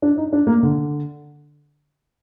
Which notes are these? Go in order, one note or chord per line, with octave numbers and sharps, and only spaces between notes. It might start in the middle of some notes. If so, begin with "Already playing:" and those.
D4
D#4
D4
A#3
D3